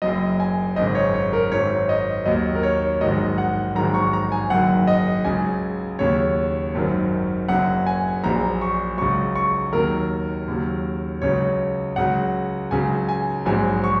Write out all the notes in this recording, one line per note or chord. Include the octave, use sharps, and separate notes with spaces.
F#1 F#2 F#3 D#5
G#5
G#1 F#2 C#3 D#5
C#5
C#5
A#4
G#1 F#2 F#3 C#5
D#5
D#2 D#3 F#3 D#5
A#4
C#5
A#1 G#2 D#3 F#3 D#5
F#5
A#1 G#2 D#3 F#3 A#5
C#6
A#5
G#5
F#1 F#2 D#3 F#3 F#5
D#5
C#2 C#3 F#3 G#5
D#2 C#3 F#3 C#5
G#1 F#2 D#3 F#3
F#1 F#2 C#3 F#3 F#5
G#5
A#1 A#2 F#3 A#5
C#6
C#2 C#3 F#3 C#6
C#6
D#2 D#3 F#3 A#4
D#2 C#3 F#3
C#2 C#3 F#3 C#5
C#2 C#3 F#3 F#5
C#2 C#3 F#3 G#5
G#5
A#1 G#2 F#3 G#5
C#6